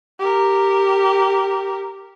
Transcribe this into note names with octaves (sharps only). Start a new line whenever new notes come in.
G4 A#4